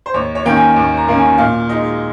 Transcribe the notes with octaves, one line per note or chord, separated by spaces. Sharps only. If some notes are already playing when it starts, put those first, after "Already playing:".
C5
D#2 C#5
C#5
D#3 A#3 C#4 G5
G#5
D#2
A#5
D#3 A#3 C#4
G#5
A#2 F5
G#3 D#4 D#5